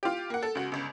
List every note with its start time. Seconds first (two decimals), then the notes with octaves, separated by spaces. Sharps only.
0.03 F4 G4
0.30 A#3 F#5
0.43 A4
0.55 C#2 F#4
0.72 G1 C#2